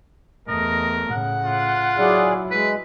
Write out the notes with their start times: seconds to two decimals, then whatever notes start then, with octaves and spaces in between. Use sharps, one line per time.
0.48 E2 A3 A#4 D#5
1.11 A2 C#3 F#5
1.45 F4
1.98 F#3 E4 G#4 D5
2.51 G#3 B4